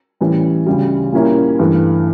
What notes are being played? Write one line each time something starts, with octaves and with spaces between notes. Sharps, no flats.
A2 E3 G3 C#4
D2 C#3 G3
A#2 G3 A#3 C#4 E4
G2 E3 A3